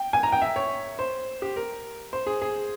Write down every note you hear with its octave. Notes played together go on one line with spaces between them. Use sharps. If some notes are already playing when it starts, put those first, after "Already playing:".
Already playing: G5
G#5
A#5
G5
E5
C#5
C5
G4
A#4
C5
G#4
G#4